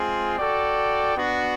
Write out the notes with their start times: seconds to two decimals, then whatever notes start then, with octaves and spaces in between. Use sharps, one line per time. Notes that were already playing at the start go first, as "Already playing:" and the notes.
Already playing: G#3 C4 F4 G#4
0.36 F#4 A4 D5 G5
1.15 B3 D4 F#4